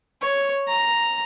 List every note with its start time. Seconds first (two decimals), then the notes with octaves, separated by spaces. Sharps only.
0.22 C#5
0.68 A#5